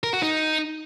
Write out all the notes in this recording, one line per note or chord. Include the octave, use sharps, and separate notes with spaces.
A#4
F#4
D#4